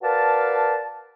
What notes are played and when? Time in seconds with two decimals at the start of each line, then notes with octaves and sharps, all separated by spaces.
0.02 F#4 A#4 B4 D5 F5 A5